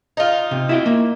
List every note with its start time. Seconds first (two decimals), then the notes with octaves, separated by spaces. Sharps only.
0.17 D#4 F4
0.51 C3
0.69 E4 F#4 G5
0.86 A#3